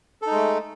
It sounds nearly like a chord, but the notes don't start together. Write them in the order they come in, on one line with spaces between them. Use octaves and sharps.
A4 D#4 G#3 A3